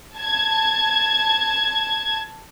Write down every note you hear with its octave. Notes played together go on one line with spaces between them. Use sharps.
A5 G#6